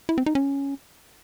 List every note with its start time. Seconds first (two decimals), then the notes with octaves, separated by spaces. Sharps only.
0.09 E4
0.18 C4
0.26 D#4
0.35 C#4